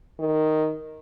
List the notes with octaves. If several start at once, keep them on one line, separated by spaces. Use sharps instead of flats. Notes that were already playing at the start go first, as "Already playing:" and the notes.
D#3